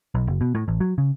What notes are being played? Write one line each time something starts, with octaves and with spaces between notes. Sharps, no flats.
B1
F#1
B2
A2
A1
F#3
C#3